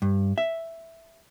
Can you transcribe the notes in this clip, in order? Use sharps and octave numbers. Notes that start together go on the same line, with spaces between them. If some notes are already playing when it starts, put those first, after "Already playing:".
G2
E5